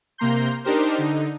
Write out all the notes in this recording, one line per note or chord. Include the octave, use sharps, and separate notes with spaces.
C3 A#3 A#5 C6 G6
D4 D#4 G4 A#4 C5
D3 D#4